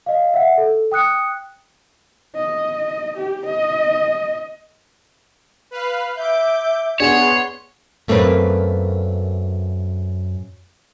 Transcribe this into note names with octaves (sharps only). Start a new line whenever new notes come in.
D#5 F5
E5 F#5
A4
G5 D#6 F#6 C#7
D#5
G4
D#5
B4 F5
E5 D6 G6
B3 D4 G#4 C#5 F#5 C6
F#2 A3 A#3 C4 B4